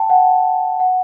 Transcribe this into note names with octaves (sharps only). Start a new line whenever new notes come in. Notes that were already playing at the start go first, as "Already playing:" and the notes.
Already playing: G5 A5
F#5
F#5